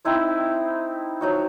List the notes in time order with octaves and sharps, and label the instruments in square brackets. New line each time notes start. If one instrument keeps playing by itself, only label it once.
[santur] C4 D#4 E4 C5
F3 F#3 D#4 F#4